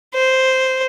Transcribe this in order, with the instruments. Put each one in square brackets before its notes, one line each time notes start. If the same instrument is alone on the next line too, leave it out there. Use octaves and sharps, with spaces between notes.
[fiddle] C5